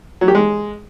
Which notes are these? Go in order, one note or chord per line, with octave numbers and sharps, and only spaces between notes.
F#3
G4
G#3